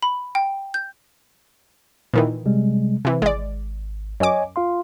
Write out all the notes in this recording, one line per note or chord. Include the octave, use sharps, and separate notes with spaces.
B5
G5
G6
A#2 D#3 E3
C3 G3 G#3
C3 E3
G#1 G#3 D5
F#2 C#5 D#5 G#5 D6
F4 F5 C6